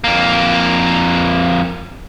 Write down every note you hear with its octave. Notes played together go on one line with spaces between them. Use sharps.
F2 A#3